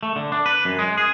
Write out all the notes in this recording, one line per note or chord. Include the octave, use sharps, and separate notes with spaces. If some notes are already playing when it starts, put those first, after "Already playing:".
A3
D3
D4
B4
F#2
G#3
G#4